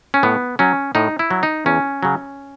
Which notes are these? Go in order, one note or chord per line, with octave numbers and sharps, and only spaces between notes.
C#4
A2 B3
F#3 C#4
A2 D#4
E4
F#3
D#4
E2 C#4
C#3 F#3